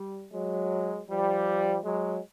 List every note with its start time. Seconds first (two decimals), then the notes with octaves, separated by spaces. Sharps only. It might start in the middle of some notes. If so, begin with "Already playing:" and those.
Already playing: G3
0.32 F#3 G#3
1.08 F3 G3
1.83 F#3 G#3